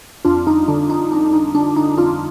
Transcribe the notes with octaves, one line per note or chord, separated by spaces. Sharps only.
F2 D4 F4
G1 D#4
D3 D4
G1 D#4
F2 D4
G1 D#4
D3 D4
G1 D#4
F2 D4 F4